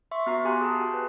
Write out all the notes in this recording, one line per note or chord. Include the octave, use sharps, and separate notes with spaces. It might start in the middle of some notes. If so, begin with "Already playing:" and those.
E5 C6 C#6
B3 F#4 A#5 C7
G4 F5 G#5 A#5 C6 F#6
G#4 A5
F#4 G5
B4